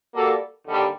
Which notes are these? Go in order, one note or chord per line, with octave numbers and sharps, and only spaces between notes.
G3 A#3 F#4 A4
D#2 D3 G3